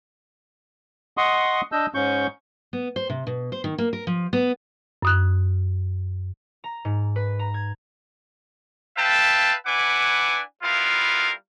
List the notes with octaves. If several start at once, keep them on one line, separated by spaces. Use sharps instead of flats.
D#5 F#5 C6 C#6 D#6
D4 D#5 E6 G6
G#2 C#4 C#6 G6
B3
C5
C3
B2
C5
D#3
A#3
A#4
F3
B3
F#2 D#6 F#6
A#5
G#2
B4
A#5
G#6
B4 E5 F5 G5 A5
D4 E4 B4 F#5 G#5 D6
G3 B3 E4 F4 A#4 F5